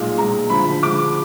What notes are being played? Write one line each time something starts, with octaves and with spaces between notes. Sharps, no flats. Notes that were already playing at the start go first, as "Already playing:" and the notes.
Already playing: B1 A#2 G#3
B1 A#2 G#3 A#5
D2 D3 F3 G#3 B5
D2 D3 F3 G#3 D6